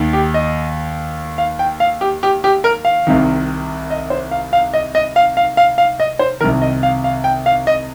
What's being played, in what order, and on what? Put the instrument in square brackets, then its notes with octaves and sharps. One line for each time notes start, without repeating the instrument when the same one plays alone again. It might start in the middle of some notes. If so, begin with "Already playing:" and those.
Already playing: [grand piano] D#2 D#3
G4
D#5
F5
G5
F5
G4
G4
G4
A#4
F5
C2 C3 D#3
D#5
C5
F5
F5
D#5
D#5
F5
F5
F5
F5
D#5
C5
D#3 A#4
C2 C3
D#5
F5
F5
G5
F5
D#5